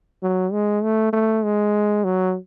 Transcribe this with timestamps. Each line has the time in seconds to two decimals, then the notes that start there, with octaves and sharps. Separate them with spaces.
0.23 F#3
0.52 G#3
0.83 A3
1.13 A3
1.44 G#3
2.04 F#3